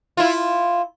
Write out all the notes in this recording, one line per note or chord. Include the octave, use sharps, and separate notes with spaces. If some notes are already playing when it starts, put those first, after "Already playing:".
E4 F4